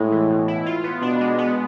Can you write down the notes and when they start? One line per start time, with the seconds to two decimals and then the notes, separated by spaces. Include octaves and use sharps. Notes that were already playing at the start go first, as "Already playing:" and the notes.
Already playing: A2 G#3
0.12 E3
0.30 B2
0.48 E4
0.66 F4
0.84 B3
1.02 B2 D4
1.21 G#3
1.38 B3